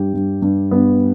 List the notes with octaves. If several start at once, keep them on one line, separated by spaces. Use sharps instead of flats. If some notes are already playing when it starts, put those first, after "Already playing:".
Already playing: G2 G3 G4
G2
G2
G2 B3